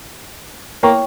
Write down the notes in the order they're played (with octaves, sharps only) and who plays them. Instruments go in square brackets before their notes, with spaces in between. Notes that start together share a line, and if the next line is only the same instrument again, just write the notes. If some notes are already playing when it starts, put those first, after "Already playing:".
[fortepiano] A#3 [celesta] E4 A#4 C#5 G5 C#6